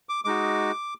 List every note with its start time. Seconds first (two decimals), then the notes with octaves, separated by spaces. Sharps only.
0.09 D6
0.25 G#3 D#4 F#4 D6